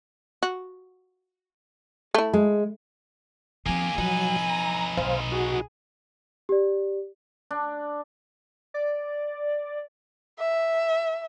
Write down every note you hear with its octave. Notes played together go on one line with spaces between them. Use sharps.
F#4
A3 E4
G#3
F3 A#3 C4 G4 G#5
F3 F#3 D#4 B4
A#5
B1 C5 F5
F#4 G#4
G4 D5
D4
D5
E5